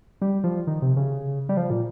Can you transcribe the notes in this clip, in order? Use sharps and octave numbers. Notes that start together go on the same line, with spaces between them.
G3
F3
D#3
C3
C#3
G3
F3
A#2